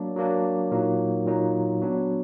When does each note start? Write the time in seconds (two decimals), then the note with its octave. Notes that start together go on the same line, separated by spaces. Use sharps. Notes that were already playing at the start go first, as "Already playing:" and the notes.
Already playing: F#3 A#3 D4
0.16 F#3 A#3 D4
0.72 A#2 F#3 A#3 D#4
1.26 A#2 F#3 A#3 D#4
1.82 F#3 B3 D4